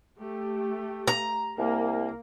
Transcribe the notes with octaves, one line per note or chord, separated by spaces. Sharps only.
A3 G4
A#5
C2 A#3